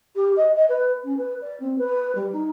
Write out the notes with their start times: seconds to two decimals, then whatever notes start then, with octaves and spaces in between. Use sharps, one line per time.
0.16 G4
0.37 D#5
0.56 D#5
0.69 B4
1.04 C#4
1.17 B4
1.42 D5
1.60 C4
1.78 B4
2.15 G3
2.33 D#4